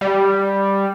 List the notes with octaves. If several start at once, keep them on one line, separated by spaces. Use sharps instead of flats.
G3